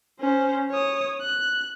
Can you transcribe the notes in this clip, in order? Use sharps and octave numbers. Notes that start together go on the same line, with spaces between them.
C#4 C5
C#5 D#6
F#6